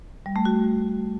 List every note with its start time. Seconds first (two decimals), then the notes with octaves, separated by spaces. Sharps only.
0.26 G3
0.36 A3
0.45 F#4